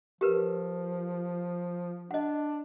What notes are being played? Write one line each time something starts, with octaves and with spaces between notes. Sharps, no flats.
F3 G4 A#4 B4
D4 D#5 F#5